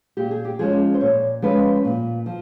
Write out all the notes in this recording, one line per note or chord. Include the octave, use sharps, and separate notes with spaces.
A#2 G4
G#4
G4
F3 G#3 C#4 G#4
C5
A#2 C#5
F3 G#3 C#4 B4
A#2
F3